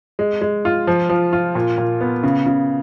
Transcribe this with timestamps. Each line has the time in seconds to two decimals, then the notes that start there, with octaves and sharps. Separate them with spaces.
0.19 G#3
0.41 G#3
0.65 F4
0.87 F3
1.09 F3
1.33 F4
1.55 A#2
1.78 A#2
2.01 B3
2.23 C#3
2.46 C#3